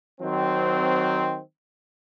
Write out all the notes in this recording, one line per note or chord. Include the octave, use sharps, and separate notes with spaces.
D#3 F#3 C4